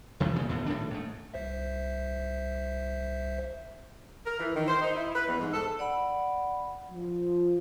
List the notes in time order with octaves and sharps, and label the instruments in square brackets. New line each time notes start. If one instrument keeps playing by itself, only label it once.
[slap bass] E2 C3 D#3 F3
G2 A#2 C#3
F1 D#2 A2 B3
A#1 A2 D#3 D4
G#2 A3
[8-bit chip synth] C2 C5 E5
[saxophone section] A#4
E3
D#3
C5
D#4
E4
B4
E2
G#2
A4
[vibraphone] D5 F#5 B5
[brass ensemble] F3